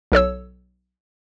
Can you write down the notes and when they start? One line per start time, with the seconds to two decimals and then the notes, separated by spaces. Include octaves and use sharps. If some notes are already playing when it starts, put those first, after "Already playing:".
0.12 B1 A4 C#5 E6